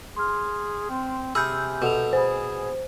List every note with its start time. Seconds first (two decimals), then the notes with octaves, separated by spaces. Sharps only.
0.16 G#4 C6 F6
0.89 C4
1.35 C3 G#4 G#5 B5 E6 F6 G6
1.82 B2 A4 F7
2.13 G#4 C5 G#5 B5